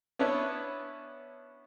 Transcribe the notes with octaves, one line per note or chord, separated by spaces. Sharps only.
B3 C#4 D4 E4 B4 C#5